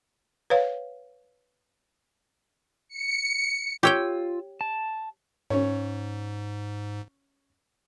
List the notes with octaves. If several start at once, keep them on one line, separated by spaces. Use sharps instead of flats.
B4 C#5 F5
C#7
F4 G4 C#5 G5 E6
A5
G#2 C#4 C#5